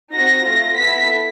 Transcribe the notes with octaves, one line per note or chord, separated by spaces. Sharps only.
C4 D#4 F#4 A#6
A3 C4 F4
B3 E4 A4 B6